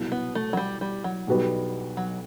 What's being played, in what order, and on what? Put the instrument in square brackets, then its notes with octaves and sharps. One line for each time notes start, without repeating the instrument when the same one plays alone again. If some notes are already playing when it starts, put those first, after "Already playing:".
Already playing: [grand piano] C2 B2 F#3
[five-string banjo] B3
A3
F#3
G3
G3
F#3
[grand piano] B1 B2 G3 B3 F#4
[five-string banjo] F#3